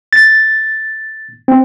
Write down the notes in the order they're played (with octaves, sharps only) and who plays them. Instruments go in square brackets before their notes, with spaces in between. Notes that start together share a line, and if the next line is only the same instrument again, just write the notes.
[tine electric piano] A6
C4